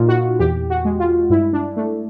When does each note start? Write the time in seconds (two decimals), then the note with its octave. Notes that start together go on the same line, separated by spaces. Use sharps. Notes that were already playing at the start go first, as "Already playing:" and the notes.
Already playing: A#2 D#4 F4
0.08 F#4
0.39 E2 G4
0.70 F#4
0.85 G#3
1.00 F4
1.30 G2 E4
1.53 D4
1.76 A3 D4